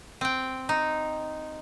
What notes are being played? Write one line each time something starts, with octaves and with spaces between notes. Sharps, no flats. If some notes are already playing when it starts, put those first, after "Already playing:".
C4 G5
D#4